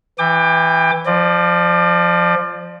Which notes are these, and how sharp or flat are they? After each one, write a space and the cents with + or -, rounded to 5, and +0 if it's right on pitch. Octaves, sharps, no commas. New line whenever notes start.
E3 +0 G5 +25 D6 +25
F3 +0 D5 +35